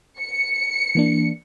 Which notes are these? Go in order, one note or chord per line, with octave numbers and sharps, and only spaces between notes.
C#7
E3 A#3 D4